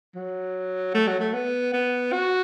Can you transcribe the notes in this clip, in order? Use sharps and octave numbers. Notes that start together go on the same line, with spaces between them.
F#3
A3
F#3
A3
B3
B3
F#4